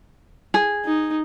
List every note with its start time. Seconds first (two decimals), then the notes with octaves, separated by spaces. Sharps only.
0.54 G#4
0.85 D#4